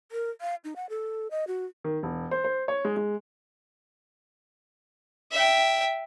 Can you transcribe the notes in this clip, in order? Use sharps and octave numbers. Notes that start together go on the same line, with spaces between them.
A#4
F5
D#4
F#5
A4
D#5
F#4
D#3
E1
C5
C5
C#5
G#3
G#3
E5 G5